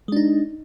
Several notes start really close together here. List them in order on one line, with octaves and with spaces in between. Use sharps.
G#3 D4 D#4